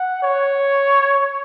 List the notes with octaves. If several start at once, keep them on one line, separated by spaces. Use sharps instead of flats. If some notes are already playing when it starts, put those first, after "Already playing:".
Already playing: F#5
C#5